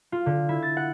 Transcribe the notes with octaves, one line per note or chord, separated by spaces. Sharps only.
F4
D3
E4
A6
F#5